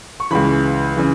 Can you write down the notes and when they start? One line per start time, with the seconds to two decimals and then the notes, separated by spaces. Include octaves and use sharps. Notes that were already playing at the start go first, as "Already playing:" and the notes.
0.20 C#6
0.31 C#2 C#3 E3 B5
0.97 C#3 E3